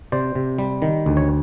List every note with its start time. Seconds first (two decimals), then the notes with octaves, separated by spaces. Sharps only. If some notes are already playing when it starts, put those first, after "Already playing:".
0.12 C3 C5 D5
0.35 C3
0.59 G3
0.82 D#3
1.06 D2
1.17 C#5